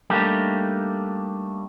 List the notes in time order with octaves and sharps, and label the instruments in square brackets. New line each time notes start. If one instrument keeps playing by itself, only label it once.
[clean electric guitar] G3 A3 A#3 D4 D#4 G4